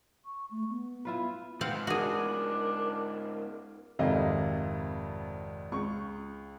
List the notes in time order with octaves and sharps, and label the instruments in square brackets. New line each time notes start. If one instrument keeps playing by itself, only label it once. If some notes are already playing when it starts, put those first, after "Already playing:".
[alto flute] C#6
A3
B3
[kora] E4 F4 B4
[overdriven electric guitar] G#2 B3 [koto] C4 F5 F#5
[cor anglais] D4 [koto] F#4 G#4 [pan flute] A#4
[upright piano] G#1 F2 C3 D#3 D#5 F5
C#2 C#6